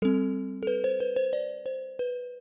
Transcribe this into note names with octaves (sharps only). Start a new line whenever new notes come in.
G3 C4 A4
A4
B4
C5
B4
C5
D5
C5
B4